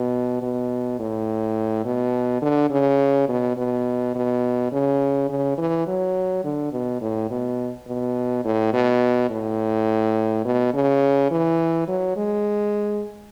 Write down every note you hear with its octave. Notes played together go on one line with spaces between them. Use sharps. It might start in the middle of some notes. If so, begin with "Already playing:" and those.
Already playing: B2
B2
A2
B2
D3
C#3
B2
B2
B2
C#3
C#3
E3
F#3
D3
B2
A2
B2
B2
A2
B2
A2
B2
C#3
E3
F#3
G#3